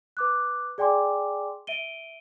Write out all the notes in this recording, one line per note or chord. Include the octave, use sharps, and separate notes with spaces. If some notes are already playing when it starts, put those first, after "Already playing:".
B4 D6 F#6
G#4 D5 G5 G#5 C6 D6
E5 D7 D#7 G7